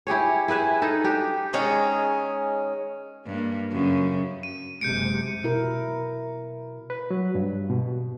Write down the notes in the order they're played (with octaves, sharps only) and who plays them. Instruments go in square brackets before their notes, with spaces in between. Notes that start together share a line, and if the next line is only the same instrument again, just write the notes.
[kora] E4 G4 G#4 C#5
E4 G#4 B4 E5
D#4 A4
D4 G4
[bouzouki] D#3 G#3 C#4
[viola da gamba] G2 A#3
F#2 C#3
[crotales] D#7
[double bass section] F#1 C3 G#3 [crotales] G6 C#7 D7
[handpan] B2 E4 A#4
[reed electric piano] B4
F#3
G2
B2